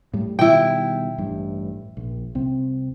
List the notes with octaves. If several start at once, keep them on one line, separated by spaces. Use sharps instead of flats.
A2 G3
B2 D#3 G3 E4 G5
A1 G2
A#1
C2 C4